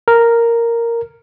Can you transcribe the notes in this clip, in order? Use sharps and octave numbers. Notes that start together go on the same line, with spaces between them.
A#4